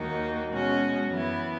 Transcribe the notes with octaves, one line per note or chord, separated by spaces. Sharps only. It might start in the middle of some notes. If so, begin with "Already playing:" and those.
Already playing: D#2 D#3 A#3 D#4 F#4
B2 G#3 C#4 F#4
F#2 E3 B3 E4